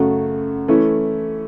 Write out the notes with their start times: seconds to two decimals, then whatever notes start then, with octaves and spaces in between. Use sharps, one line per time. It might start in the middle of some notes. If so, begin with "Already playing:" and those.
Already playing: F#2 C#3 A3 F#4
0.68 E3 A3 C#4 E4